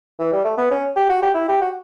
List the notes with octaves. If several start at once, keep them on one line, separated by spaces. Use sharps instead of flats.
E3
G3
A3
B3
C#4
G4
F#4
G4
E4
G4
F#4